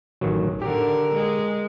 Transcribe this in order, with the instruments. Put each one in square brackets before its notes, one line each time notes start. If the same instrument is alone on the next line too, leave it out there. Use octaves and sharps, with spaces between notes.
[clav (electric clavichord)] A1 D#3 F#3
[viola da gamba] D3 A#4 [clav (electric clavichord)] G4
[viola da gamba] G#3